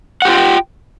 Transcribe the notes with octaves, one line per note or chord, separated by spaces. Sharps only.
F4 G4 F#5 G5